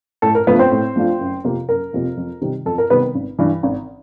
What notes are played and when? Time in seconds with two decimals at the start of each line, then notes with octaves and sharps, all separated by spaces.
0.22 A2 A4
0.35 A#4
0.47 F3 A3 B3 D4 F4 B4
0.59 C4 C5
0.72 A2
0.96 F3 A3 D4 F4
1.20 F#1
1.44 F2 C3 F3 A#3
1.69 F#1 A#4
1.93 F2 C3 F3 A#3
2.17 F2
2.41 C3 D#3 G3
2.66 F2 A4
2.78 A#4
2.90 C3 D#3 G3 B3 B4
3.15 G#1
3.39 G2 E3
3.63 G#1